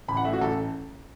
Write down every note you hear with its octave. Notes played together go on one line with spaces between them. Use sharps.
A1 B5
F#5
A2 E5
F#4
A1 A4